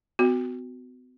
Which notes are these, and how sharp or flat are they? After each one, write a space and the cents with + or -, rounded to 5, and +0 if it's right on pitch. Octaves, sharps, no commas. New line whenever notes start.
B3 +40 F#4 +0